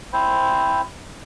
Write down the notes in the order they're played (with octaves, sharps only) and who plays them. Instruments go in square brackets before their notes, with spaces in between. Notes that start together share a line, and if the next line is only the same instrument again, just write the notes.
[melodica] C4 E4 C5